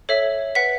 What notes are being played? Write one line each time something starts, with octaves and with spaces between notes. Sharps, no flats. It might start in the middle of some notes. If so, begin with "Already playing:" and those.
A4 C#5 E5
B4 F#5 B6